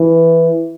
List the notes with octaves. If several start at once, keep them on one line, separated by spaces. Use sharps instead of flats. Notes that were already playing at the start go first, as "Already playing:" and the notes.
Already playing: E3